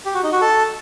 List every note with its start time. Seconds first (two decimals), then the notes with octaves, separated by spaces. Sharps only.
0.06 G4
0.15 F#4
0.23 D#4
0.32 F#4
0.41 A4